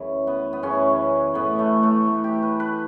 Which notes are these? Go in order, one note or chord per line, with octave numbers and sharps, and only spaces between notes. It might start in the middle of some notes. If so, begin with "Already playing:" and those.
Already playing: F#2 C#3 E3
B3
B3
F#2 C#3 E3 C#4
A2 E3 B3
A3
A3
A2 E3 B3
G4
B4
B4